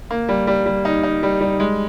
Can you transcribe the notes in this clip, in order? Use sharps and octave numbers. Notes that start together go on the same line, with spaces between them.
A#3
G3
G3
G3
D#4
D#4
G3
G3
G#3